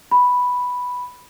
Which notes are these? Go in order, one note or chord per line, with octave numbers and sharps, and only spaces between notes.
B5